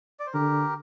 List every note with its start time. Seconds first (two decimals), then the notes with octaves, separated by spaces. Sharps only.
0.20 D5
0.27 C5
0.34 D3 G4 A#4